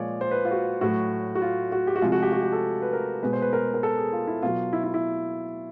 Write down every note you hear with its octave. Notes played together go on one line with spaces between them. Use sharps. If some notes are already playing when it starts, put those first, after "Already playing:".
Already playing: A#2 F3 G#3 C#5 D5
C5
B4
F4
F#4
A2 F#3 F#4
F#4
F4
F#4
G4
F#4
C3 F3 G#3 F4
F#4
G4
F#4
G4
A4
B4
A#4
B2 G#3 B4
C5
B4
A#4
A#4
A4
G#4
F4
E4
B2 F#3 F4
E4
E4
E4